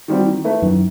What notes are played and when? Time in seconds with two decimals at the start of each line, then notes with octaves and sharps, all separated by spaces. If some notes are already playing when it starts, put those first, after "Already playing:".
0.08 D#3 G3 C4 F#4
0.27 D#3
0.44 A3 E4 B4
0.62 F#2 D#3